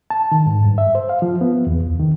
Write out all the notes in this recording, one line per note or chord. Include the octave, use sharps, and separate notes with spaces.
A5
D#3
G#2
G2
E5
C5
F5
F3
B3
E2
C#2
D#3